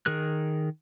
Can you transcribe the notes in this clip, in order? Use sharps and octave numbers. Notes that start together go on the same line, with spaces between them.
D#3 G#4 A#4 F#6